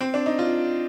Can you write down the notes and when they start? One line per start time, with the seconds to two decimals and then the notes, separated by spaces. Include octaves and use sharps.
0.01 C4
0.14 D4
0.26 D#4
0.39 F4